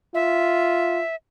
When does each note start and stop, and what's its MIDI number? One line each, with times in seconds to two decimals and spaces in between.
0.14 1.01 65
0.14 1.15 76